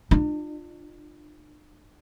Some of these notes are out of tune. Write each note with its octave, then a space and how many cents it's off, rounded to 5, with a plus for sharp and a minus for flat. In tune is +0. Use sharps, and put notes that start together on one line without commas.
D4 +40 F4 +0